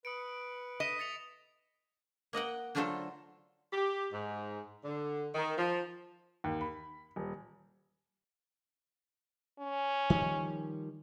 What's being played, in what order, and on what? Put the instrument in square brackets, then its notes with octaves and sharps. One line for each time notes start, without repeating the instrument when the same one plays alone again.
[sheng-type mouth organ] B4 [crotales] D#6 C#7 D7
[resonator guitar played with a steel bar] D#5 [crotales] A#6 B6 E7
[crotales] A6 C#7 F7
[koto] A#3 D#5 F#5 G5
D3 F#3 A3 F4 A4 C5
[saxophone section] G4
G#2
D3
D#3
F3
[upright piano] D#2
B5
D#1
[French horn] C#4
[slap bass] D#3 F3 G3